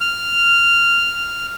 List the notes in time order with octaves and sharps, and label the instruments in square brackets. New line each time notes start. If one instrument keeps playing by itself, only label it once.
[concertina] F6